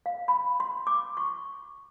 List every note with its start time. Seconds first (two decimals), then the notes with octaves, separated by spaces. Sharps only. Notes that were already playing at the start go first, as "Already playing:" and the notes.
0.06 F5
0.28 B5
0.60 C6
0.87 D6
1.17 C#6